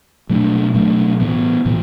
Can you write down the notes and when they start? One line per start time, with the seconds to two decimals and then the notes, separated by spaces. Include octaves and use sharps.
0.30 B2 F#3 A3 D4
0.74 B2 F#3 A3 D4
1.20 A2 E3 B3
1.65 A2 E3 B3